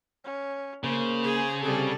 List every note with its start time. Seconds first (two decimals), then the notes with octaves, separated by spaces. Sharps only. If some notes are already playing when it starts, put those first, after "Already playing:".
0.24 C#4
0.84 C#3 A#3 C5
1.24 G#4
1.63 C3 G3 G#4 A4